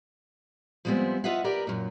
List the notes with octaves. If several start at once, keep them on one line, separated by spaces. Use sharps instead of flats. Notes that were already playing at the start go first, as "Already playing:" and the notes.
F3 G3 G#3 B3 C4 E5
F4 B4 D#5 E5 F#5
G4 A#4 B4 D5
F#2 A#2